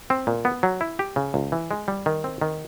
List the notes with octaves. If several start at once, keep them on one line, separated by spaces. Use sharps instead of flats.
C4
A#2
B3
F#3
E4
G4
C#3
C#2
E3
G#3
G3
D#3
C4
D#3